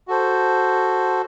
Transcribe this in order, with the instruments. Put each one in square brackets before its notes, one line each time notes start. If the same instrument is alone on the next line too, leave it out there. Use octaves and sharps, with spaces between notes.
[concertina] F#4 A4 C5